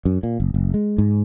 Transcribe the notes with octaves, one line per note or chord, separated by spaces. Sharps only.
F#2
A#2
F#1
F#1
G#3
G#2